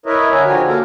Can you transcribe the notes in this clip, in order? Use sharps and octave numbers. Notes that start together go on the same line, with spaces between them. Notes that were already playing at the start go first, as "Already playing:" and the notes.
E4 A#4 B4 C#5 D#5 E5
D3 G#5 A#5
D3 F3 F#4 G4 C#5 G#5
A#3 A4 A#4 A#5